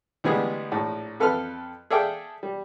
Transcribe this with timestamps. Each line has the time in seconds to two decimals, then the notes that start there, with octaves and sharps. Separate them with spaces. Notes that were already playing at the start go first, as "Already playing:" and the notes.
0.24 D2 E3 G3 G#3 B3 G#4
0.72 A#1 A2
1.20 F2 A4 B4 F5 F6
1.90 G#4 A4 D5 E5 F5 G5
2.43 G3